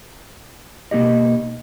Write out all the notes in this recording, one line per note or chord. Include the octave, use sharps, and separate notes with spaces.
B2 A#3 D#4 G4 D#5